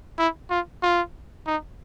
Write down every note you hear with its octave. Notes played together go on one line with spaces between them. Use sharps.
E4
F4
F4
D#4